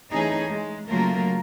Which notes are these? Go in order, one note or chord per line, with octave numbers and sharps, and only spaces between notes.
E3 A3 C#4 D#4 G#4
G#3
C#3 F#3 A3 A#3 F4 A#4